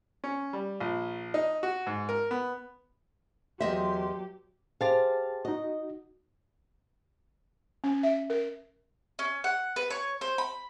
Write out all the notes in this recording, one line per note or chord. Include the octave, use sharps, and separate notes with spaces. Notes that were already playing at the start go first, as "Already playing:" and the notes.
C#4
G3
A#1
D#4
F#4
G#2
A#4
B3
E2 F#3 G4 D#5 E5 C6
G4 G#4 C5 F5 A5 A6
D#4 F#4 D#5
C#4
E5
A#4
C#4
F#5
B4
C#5
C5
B5